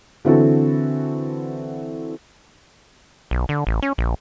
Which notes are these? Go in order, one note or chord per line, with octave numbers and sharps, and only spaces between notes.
D3 E3 C4 E4 F#4 A4
B1
D3
A1
C#4
A#1